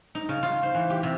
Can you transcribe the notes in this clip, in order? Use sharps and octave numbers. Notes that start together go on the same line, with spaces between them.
D#4
C#3
F4
C5
E3
G4
C3